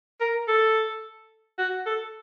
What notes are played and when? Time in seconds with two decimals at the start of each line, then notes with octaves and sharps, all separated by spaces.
0.21 A#4
0.48 A4
1.59 F#4
1.86 A4